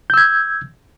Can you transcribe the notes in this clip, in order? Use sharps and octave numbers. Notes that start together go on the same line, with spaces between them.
E6 G6 G#6